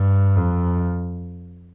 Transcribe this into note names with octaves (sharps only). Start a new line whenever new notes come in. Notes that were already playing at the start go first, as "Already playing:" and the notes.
Already playing: G2
F2